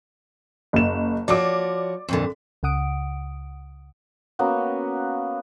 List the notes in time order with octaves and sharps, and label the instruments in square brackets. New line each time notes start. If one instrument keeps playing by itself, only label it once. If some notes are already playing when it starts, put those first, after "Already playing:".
[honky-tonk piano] F#1 E7
[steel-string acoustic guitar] F3 F#4 C#5 [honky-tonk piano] D5 D6
[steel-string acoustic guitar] F2 A#2 D3
[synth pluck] C#2 C#3 F#5 D#6 D7
[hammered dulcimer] A#3 B3 C#4 F#4